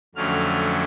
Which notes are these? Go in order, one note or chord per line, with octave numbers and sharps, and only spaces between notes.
F2 D3 F#3 A3 C#4 F6